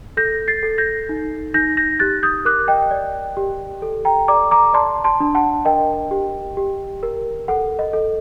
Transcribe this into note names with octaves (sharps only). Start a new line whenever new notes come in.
A4 G6 A#6
A6 C7
A4
G6 A#6
D#4
D#4 G6 A#6
G6 A#6
G4 F#6 A6
D#6 G6
A#4 D6 F#6
D#5 G5
D5
G4
A4
G5 A#5
D5 A#5 D6
A#5 D6
D5 A5 C6
A5 C6
D4
F#5 A5
A#4 D#5 G5
G4
G4
A#4
A4 F#5
D#5
A4